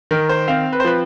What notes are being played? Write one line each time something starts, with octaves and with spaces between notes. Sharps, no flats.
D#3 A#4
C5
C4 F5
B4
C5
F3 B4